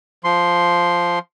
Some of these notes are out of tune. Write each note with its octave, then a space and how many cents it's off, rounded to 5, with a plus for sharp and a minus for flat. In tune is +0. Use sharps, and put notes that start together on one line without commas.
F3 +0 C6 +0